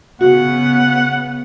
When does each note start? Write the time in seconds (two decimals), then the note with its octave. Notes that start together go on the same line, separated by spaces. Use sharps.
0.21 C#3 B3 F#4 F#5